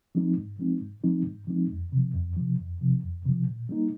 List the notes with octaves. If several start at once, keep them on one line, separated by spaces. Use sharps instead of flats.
F3 G#3 C4 D#4
G#2
F3 G#3 C4 D#4
G#2
F3 G#3 C4 D#4
G#2
F3 G#3 C4 D#4
F2
C3 F3
F2
C3 F3
F2
C3 F3
F2
C3 F3
A#2
G3 A#3 D#4